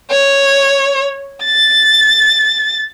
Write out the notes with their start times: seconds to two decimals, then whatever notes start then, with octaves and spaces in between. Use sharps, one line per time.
0.11 C#5
1.44 A6